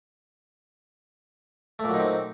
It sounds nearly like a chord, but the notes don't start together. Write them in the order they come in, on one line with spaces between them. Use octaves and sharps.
A3 A#2 F#3 D#4 C4